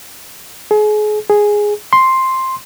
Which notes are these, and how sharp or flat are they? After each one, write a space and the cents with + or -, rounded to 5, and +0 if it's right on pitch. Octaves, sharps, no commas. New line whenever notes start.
G#4 +35
G#4 +0
C6 +5